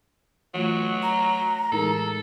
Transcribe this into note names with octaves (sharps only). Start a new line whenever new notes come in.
E3 F#3 A3 F4
A#5
A2 E3 G#3 D#4 A4 A#4